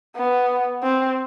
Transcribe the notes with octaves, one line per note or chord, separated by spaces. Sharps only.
B3
C4